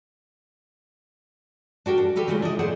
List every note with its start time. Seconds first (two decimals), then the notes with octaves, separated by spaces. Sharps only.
1.86 D4 F#4 G4 A#4
1.98 D4
2.16 G4 A4 B4 F5
2.27 C#3 E3 G#3 A3 F4
2.42 D4 E4 D#5
2.59 F2 A2 G#4 C5 D5 F#5